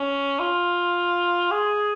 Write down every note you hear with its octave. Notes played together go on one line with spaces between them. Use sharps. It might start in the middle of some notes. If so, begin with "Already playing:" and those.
Already playing: C#4
F4
G#4